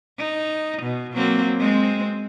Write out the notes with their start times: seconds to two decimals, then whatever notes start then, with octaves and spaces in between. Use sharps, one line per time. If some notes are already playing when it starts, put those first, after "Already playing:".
0.19 D#4
0.83 B2
1.14 F#3 A#3 C4
1.60 G#3 C4